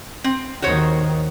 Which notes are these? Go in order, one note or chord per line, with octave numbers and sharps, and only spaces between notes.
C4
D#2 D#3 F#4 C5 C#5